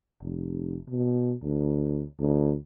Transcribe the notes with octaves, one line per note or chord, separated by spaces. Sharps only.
F1
B2
D2
D2